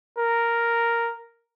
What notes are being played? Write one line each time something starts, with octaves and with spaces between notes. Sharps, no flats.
A#4